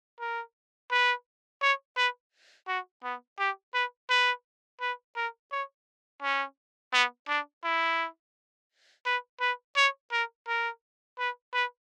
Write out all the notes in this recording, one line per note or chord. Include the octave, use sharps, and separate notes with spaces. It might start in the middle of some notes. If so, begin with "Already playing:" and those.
A#4
B4
C#5
B4
F#4
B3
G4
B4
B4
B4
A#4
C#5
C#4
B3
D4
E4
B4
B4
C#5
A#4
A#4
B4
B4